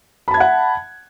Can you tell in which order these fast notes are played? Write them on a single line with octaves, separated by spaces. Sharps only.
B5 A5 G#6 E5 F#5